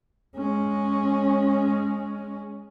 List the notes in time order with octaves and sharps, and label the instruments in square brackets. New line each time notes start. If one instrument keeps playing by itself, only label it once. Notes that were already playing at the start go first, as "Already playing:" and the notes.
[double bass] G#3 C#4